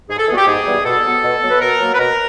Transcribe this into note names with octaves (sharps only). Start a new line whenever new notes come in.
G#2 G#4
A4
E3 G3 B3 F#4 G#4
G4
G#2 G#4
E3 G3 B3
B2 A4
F#3 B3
B2
F#3 B3
B4
B2 A#4
F#3 A#3
B4
B2 A#4